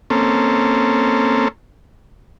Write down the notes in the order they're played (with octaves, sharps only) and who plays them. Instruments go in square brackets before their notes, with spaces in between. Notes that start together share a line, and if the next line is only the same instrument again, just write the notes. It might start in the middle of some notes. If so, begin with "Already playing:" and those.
[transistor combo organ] A#3 C4 C#4 A4